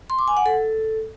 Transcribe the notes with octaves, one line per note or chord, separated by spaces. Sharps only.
C6
D6
G#5
F#5
A4